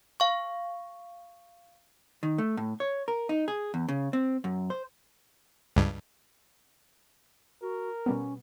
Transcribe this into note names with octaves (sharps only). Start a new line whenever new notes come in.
F5 C#6
D#3
A3
A2
C#5
A#4
D#4
G#4
E2
C#3
C4
F#2
C5
C#2 G2
F#4 A#4
B2 G3 B3 C#4